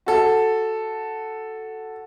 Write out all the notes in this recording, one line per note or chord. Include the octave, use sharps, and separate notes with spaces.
F#4 A4